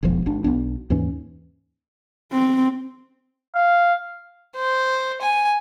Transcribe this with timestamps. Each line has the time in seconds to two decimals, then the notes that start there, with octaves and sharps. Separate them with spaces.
0.03 E1 B1 F2 F3
0.26 G#1 D4
0.44 B1 A2 B3 D4
0.90 D#2 G#2 E3 C#4
2.32 C4
3.55 F5
4.55 C5
5.21 G#5